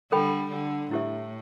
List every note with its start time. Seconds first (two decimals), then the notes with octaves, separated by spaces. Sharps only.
0.12 D3 G3 A4 G5 B5
0.51 D3
0.91 A2 E4 G4 E5